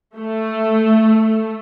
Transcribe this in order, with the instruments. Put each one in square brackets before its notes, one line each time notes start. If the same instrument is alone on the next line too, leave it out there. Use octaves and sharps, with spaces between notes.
[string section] A3